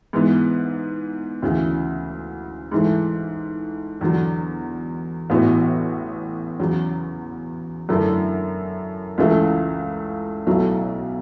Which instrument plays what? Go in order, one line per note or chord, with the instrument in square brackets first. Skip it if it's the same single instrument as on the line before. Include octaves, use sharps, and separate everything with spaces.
[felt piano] G#2 E3 B3
D2 C#3 E3
G#2 E3 A3
E2 D3 F#3
A1 A2 E3 B3 F#4
E2 C#3 F#3
F#2 D3 A3 E4
C#2 C#3 E3 A3
B1 B2 F#3 A3 E4